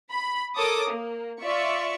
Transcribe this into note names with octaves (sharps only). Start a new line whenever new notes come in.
B5
A4 A#4 C#5 D6 D#6
A#3
F4 D5 E5 C#6